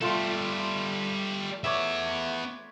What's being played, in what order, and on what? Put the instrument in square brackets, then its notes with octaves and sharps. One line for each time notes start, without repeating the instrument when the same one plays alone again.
[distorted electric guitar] G3 A4 [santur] A3 F4 C6
[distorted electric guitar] B3 E5 [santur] C#5 D5 B5